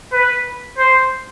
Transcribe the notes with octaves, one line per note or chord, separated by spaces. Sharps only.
B4
C5